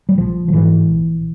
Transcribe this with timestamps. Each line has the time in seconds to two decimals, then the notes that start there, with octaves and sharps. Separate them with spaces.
0.09 G3
0.18 A#1 F3
0.48 F3
0.53 G#2 E3
0.88 A#1